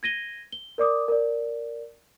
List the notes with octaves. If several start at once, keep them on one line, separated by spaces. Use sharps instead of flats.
G#6 A#6 D#7 G7
G7
A#4 D5 D6 D#6
A#4 D5